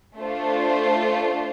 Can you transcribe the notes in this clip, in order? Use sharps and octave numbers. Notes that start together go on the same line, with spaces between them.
A3 D4 F4 C5